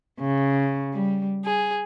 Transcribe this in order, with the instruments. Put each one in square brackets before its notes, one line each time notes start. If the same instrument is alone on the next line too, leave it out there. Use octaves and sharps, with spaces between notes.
[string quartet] C#3
G3
G#4